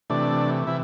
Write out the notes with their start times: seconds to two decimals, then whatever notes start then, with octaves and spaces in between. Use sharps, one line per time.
0.10 C3 E3 A3 D4 D5
0.67 C3 E3 E4 E5